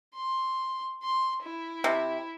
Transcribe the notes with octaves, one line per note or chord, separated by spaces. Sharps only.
C6
C6
E4
C3